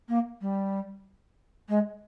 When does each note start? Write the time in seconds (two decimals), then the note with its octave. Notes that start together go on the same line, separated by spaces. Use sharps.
0.09 A#3
0.41 G3
1.69 G#3